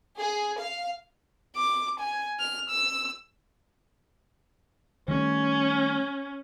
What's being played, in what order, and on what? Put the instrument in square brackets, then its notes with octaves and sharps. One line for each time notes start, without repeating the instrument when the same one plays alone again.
[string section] G#4
F5
[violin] D6
G#5
F6
E6
[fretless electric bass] D#3 G3 A3 [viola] C#4